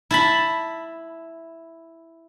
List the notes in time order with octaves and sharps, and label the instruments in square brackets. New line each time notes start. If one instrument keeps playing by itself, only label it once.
[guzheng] E4 A5 B5